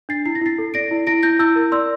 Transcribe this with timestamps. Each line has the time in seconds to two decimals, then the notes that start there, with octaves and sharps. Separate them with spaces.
0.09 D4 A6 C7
0.25 E4 C7
0.35 A#6
0.41 E4 A6 C7
0.58 A4
0.74 D5 A#6 D7
0.91 E4
1.07 E4 A#6 D7
1.23 E4 G6 A#6
1.39 E4 E6 G6
1.56 A#4
1.72 D5 C6 E6